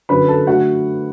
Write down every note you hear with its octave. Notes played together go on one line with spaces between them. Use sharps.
F#2 D3 F#3 B4 B5
A4 A5
D3 F#3 A3 F#4 F#5